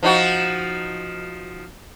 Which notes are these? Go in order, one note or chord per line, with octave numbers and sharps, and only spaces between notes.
F3 D#4 F#4